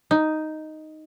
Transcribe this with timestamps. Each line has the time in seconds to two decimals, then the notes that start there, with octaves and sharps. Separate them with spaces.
0.11 D#4